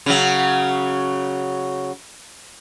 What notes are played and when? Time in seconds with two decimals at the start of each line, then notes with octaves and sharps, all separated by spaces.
0.06 C#3 F#3